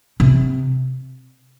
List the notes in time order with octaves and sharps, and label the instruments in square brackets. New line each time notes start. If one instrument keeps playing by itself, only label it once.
[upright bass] C3